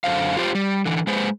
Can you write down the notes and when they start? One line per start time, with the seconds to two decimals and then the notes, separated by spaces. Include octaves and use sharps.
0.04 F#2 D3 C5 F5
0.37 F4 G4 C5
0.55 G3
0.86 D3 E3
1.07 G#3 B4 C5